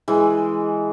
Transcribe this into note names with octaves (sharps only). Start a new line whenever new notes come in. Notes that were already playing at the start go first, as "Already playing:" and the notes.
E3 G#3